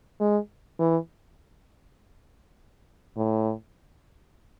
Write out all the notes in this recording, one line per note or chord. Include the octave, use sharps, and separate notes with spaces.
G#3
E3
A2